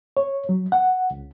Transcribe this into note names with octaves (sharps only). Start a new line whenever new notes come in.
C#5
F#3
F#5
C#2